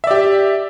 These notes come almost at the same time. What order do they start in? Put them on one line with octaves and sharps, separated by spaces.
E5 D5 G4